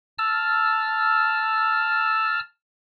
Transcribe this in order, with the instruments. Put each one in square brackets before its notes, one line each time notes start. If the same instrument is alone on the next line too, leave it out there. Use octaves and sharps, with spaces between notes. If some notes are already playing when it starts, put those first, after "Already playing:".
[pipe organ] A5 E6 F6